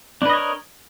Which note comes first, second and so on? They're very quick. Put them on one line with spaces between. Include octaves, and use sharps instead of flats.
D4 B4 D#5 C#5 A#4